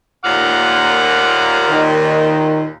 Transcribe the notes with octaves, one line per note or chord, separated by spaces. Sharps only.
D#2 A#2 F#5 D6 F6
D#3